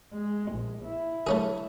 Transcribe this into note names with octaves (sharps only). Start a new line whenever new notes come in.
G#3
A#1
E4
A3 C#4 G#4